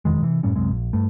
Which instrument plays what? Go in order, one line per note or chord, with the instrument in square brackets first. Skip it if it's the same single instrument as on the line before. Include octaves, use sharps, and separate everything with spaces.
[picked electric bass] E1 F2 D#3 G#3
C3 E3
F#2 A2 G3 C#4
C2 F#2 C3 G#3
A#1
G2 A3